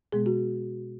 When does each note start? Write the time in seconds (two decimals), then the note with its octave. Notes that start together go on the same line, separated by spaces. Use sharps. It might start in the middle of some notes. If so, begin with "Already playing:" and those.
0.12 B2 G#3 B3 G#4
0.26 F#4